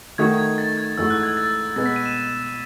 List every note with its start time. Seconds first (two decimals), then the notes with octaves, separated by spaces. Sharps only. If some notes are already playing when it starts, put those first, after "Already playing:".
0.18 D#3 A3 D#4 F#4 G#6
0.38 G#6
0.58 A6
0.78 G#6
0.97 G#2 E3 A3 D#4 F#4 E6
1.10 F#6
1.23 G#6
1.37 A6
1.76 B2 G#3 B3 A6
1.86 B6
1.96 D#7
2.06 E7